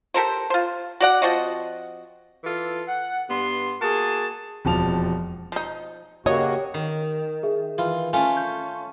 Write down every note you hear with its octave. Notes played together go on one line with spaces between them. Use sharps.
G4 A4 A#4 C5
F4 C5
F#4 D5 F#5
F3 C4 F#4 D#5
E3 F4 A4
F#5
G2 G3 B3 C6
A#3 F#4 G#4 A5
E1 F2 F3 A5 F7
F3 D#4
C#3 A#3 F#4 G4 C#5 D#5
D#3
G#4 E5
E3 F4
A3 C#4 F4 G#5
G6